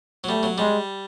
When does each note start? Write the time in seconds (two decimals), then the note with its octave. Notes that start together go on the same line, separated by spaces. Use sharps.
0.24 F#3
0.29 G3 A3
0.43 F#3
0.58 G3 G#3